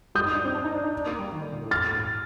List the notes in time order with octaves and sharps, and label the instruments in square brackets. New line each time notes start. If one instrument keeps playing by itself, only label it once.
[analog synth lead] G3 [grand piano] D#6 G6
[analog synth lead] D#4
D4
C4
D4
D#4
D4
D#4
D4
A#3
G3
D#3
D3
A#2
A2
[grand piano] F6 A6